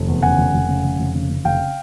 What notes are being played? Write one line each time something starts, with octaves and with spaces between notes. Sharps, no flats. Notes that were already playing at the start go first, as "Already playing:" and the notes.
Already playing: F1
E2
C#3 F#5 G#5
F1
F1
C#3
F1
F1
C#3
C#3
F1 F5 G5